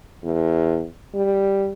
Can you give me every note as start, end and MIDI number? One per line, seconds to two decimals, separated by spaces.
0.24 0.86 40
1.15 1.73 55